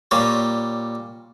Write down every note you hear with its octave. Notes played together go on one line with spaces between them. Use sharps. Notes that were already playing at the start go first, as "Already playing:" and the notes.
A#2 G3 C#5